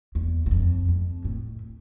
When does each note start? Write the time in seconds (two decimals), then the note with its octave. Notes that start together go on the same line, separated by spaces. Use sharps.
0.15 E2
0.46 E2
0.51 F2
0.88 F2
1.25 A2